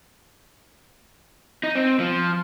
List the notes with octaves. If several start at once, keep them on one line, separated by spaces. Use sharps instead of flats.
D#4
C4
F3